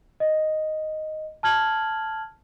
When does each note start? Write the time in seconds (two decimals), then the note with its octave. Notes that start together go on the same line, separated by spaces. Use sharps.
0.20 D#5
1.43 A5 F6 G#6 F#7